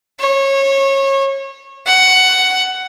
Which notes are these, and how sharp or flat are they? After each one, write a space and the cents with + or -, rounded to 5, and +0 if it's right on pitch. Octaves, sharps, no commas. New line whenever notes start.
C#5 -25
F#5 +10